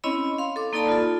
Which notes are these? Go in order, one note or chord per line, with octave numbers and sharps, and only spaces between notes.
C4 C#4 E4 C#5 D#5 B5
F5 C6
A4 D6
A#3 D#4 A4 D5 A5 B5
F4 A4